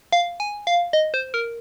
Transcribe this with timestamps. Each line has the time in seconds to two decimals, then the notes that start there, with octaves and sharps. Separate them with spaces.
0.12 F5
0.40 G#5
0.67 F5
0.93 D#5
1.14 C5
1.34 A#4